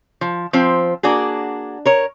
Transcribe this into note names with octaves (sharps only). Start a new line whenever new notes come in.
F3
F3 C4
A#3 D4 F#4 G#4
A#4 C#5